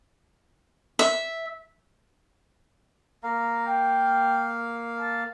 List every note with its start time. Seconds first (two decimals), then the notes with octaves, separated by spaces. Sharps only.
0.99 E5
3.23 A#3 F5 A#5
3.66 G5
4.99 A5